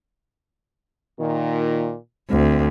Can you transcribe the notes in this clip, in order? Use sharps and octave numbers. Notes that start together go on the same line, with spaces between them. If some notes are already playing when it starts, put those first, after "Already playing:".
A#2 D#3
D2 C4